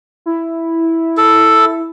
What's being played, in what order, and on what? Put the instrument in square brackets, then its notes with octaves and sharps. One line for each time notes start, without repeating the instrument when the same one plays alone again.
[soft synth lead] E4
[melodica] A4